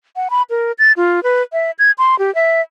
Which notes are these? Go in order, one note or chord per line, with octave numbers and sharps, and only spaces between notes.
F#5
B5
A#4
A6
F4
B4
E5
G#6
C6
G4
E5